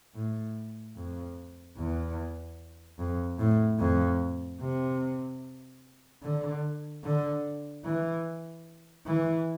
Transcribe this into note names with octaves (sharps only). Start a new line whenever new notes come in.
A2
F2
E2
F2
A2
F2
C3
D3
D3
E3
E3